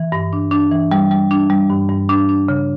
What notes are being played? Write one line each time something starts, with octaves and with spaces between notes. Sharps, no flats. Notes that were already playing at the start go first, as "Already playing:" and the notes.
Already playing: E3
G2
D4
D4
E3
G3
G3
D4
G3
G2
G2
D4
D4
C#3